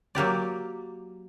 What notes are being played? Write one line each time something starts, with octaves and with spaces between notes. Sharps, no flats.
F#3 A#3 G4 D5